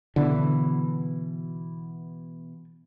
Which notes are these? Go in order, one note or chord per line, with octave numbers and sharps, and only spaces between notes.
B2 D3 E3